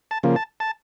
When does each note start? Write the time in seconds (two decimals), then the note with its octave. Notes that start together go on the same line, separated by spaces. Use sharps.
0.11 A5
0.23 C#3 F3 A#3
0.36 A5
0.60 A5